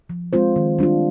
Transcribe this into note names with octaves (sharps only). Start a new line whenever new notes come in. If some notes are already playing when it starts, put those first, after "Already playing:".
F3
G#3 C4 F4 C5
D#3
G3 D4 F4